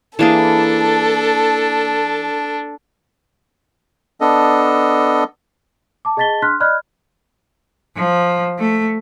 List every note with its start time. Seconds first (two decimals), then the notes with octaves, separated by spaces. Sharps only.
0.19 E3 A#3 D4 G#4 A4
4.21 B3 D4 A4 D#5
6.05 A5 D6
6.17 G#4 D#5 A5 A6 B6 G7
6.42 D4 C6 F6 F#6 B6
6.60 D5 D#5 B5 F6 F#6 G#6
7.96 F3
8.59 A3